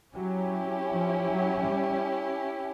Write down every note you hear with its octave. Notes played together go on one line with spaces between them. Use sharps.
F#3 C#4 E4 G4
F3
F#3
G3